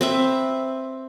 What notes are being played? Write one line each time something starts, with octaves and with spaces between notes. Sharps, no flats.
C4 B4 E5